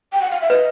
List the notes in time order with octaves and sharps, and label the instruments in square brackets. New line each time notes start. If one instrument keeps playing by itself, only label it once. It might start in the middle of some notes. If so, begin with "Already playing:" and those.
[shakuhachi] G5
F#5
F5
E5
[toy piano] B4 [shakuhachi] D#5